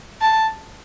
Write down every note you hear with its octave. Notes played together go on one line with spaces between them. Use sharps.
A5